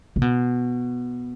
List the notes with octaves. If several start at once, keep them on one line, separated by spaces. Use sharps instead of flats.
C3
B2